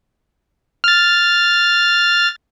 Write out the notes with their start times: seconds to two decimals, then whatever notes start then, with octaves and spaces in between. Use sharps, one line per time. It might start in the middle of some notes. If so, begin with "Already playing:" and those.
0.84 F6 A6